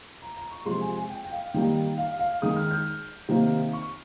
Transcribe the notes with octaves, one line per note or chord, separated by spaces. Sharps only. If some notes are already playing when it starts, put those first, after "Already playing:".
A#5
A#5
C#6
C3 F3 G#3 C6
G#5
G#5
G5
G5
F5
D#3 G3 A#3 G5
F5
F5
D#3 G#3 D#6
F6
G6
C3 D#3 A#3
C#6